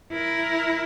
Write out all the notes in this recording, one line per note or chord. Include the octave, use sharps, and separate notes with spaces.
E4 A#4